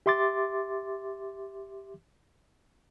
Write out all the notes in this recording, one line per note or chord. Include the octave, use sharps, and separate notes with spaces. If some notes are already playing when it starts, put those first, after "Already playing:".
G4 E5 C6 D6 A6